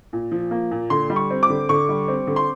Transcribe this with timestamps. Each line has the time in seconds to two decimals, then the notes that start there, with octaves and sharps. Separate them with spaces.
0.13 A#2
0.32 F3
0.51 A#3
0.71 A#2
0.90 D3 C6
1.10 G3
1.16 C#6
1.30 C4
1.43 D6
1.50 D3
1.69 D3 C#6
1.89 G3
2.08 C4
2.27 D3
2.36 C6